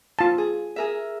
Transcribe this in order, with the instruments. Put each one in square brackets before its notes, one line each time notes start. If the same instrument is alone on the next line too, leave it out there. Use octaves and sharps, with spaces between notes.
[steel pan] F4 A5
[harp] G#4
G#4 A#4 E5